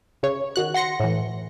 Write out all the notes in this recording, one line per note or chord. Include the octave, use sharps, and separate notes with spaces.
C#3 C#5
D#3 F#4 F#6
F#5 C6 A#6 C#7
A2 E3